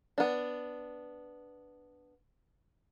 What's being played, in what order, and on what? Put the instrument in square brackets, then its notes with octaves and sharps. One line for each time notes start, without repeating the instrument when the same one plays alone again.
[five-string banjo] B3 D4